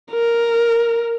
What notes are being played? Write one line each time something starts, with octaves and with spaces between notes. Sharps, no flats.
A#4